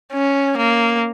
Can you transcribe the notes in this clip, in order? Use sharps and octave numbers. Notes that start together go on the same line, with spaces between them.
C#4
A#3